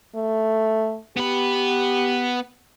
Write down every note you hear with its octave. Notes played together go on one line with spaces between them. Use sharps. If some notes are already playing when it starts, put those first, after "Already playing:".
A3
B3 G4 B4